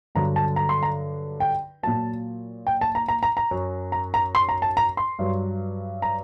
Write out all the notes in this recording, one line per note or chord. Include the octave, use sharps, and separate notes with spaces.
G2 D3 F#3 A#5
A5
A#5
C6
A#5
G5
A#2 F#3 A5
G5
A5
A#5
A#5
A#5
A#5
F#2 F#3
A#5
A#5
C6
A#5
A5
A#5
C6
G2 F#3
A#5